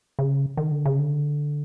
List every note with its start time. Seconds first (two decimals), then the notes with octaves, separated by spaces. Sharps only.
0.19 C#3
0.57 D#3
0.71 D3
0.85 C#3
0.99 D3